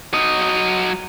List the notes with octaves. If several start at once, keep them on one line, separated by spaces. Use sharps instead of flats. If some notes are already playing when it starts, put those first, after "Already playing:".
F#3 D#5